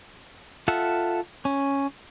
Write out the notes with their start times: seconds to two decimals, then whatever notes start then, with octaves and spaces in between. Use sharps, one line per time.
0.68 F4 A4 E5 F#5
1.45 C#4